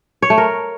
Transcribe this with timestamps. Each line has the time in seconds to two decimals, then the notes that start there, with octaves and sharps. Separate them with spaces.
0.22 C#5
0.30 A3
0.38 A#4